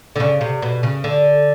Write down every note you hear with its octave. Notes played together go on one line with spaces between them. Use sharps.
D3
C#3
C3
B2
C#3
D3